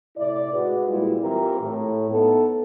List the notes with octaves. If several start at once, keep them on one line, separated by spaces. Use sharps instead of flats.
A2 C3 E4 D5
G#2 F#4 G#4 B4
A#2 G3 G#3 E4 F4
E3 C4 E4 F4 G4 A#4
A2
B3 D#4 E4 A4